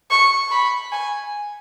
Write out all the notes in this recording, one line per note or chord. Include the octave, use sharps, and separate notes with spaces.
C#6
B5
G#5